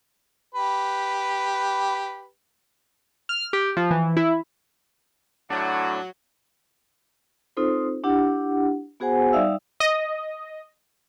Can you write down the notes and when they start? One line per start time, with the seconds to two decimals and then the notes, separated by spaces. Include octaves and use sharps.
0.55 G4 B4
3.29 F6
3.53 G4
3.77 F3
3.91 E3
4.17 E4
5.50 A2 F#3 D4
7.57 C4 D#4 F4 A4 C5
8.04 D4 E4 G4 F#5
9.00 B3 F#4 G#4 C5 F#5 G#5
9.33 G3 D#4 D5 E5 F5 E6
9.80 D#5